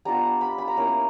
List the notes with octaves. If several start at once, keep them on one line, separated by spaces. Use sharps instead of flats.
G3 B3 D4 F4 A#5
B5
B5
A#5
A#3 C#4 E4